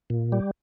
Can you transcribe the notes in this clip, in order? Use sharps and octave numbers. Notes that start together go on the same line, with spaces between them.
A#2
G3